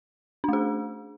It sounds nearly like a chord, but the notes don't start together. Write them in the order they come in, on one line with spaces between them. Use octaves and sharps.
D4 A3 G#4